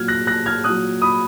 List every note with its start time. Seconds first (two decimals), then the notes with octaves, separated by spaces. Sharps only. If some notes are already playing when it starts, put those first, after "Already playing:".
Already playing: A#2 F#3 F6 G#6
0.08 F#6 A#6
0.27 F#6 A#6
0.46 F6 G#6
0.64 A#2 F#3 D#6 F#6
1.02 B5 D#6